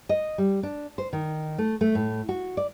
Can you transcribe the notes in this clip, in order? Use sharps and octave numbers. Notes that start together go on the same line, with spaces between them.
D#5
G3
D4
C5
D#3
A3
A3
A2
F#4
D5